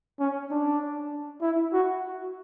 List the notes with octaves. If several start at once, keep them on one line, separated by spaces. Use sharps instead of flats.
C#4
D4
E4
F#4